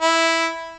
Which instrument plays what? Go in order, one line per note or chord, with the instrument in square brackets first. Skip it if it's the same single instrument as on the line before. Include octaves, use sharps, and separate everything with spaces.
[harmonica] E4